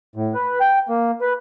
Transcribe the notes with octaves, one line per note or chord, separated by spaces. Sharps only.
A2
B4
G5
A#3
B4